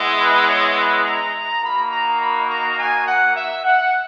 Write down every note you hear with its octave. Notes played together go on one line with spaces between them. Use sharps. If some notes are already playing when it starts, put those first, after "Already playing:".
Already playing: G#3 B3 E4
B4
C#5
B4
A#5
A#3 D#4 F#4 B5
A#5
B5
A#5
G#5
F#5
E5
F#5